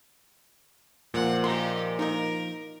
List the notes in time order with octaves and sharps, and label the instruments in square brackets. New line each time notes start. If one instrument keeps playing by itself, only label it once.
[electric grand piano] A#2 [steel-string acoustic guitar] F3 A#3 C5 [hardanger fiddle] F#5
[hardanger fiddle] D#4 G4 [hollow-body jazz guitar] C6
[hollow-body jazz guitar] D#4 D#5 [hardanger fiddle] A#4